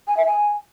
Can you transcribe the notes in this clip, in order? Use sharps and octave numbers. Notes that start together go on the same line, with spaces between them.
G#5
E5
G#5